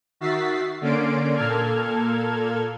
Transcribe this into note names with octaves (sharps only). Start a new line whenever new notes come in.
D#3 F#4 E5 A6 B6 C7
D3 A#3 C#4 D5 C6 D7
A#2 A#3 A4 F6 G#6